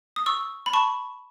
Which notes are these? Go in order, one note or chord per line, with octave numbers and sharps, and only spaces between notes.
D#6
C#6 E6
B5
A5 C#6